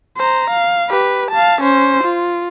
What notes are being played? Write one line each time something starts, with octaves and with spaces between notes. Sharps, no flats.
C5 A#5
F5
G4 B4
F5 A5
C#4 C5
F4